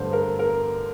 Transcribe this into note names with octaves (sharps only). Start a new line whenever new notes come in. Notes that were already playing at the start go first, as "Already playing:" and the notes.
Already playing: G2 D3 A3 C5
A#4
A#4